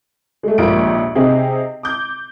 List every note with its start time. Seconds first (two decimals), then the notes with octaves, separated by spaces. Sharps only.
0.43 G#3 A3
0.58 A#1 D#2 G#2 F3 A#3 D7
1.15 C3 C4 D#4 G4 G#4
1.83 D6 G6